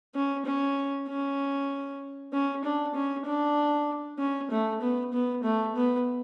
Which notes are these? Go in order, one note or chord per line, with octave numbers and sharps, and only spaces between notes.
C#4
C#4
C#4
C#4
D4
C#4
D4
C#4
A3
B3
B3
A3
B3